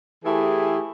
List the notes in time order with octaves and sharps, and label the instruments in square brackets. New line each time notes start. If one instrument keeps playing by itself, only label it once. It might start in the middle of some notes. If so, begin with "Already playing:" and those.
[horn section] E3 A3 E4 G4 G#4